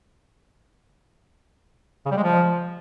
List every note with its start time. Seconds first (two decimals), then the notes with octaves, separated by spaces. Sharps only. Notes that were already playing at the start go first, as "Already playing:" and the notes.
2.05 C#3
2.11 G3
2.17 G#3
2.23 F3